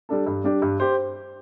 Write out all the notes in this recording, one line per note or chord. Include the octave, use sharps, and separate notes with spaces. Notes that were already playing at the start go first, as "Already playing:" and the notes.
G3 D4 A4
G2
G3 D4 G4
G2
G4 C5